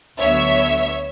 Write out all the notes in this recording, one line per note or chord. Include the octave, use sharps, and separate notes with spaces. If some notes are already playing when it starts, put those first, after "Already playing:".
D2 D3 F#3 B3 C#5 E5